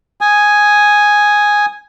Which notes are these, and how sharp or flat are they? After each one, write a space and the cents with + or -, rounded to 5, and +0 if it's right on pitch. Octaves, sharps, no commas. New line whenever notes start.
G#5 +0 D#6 +0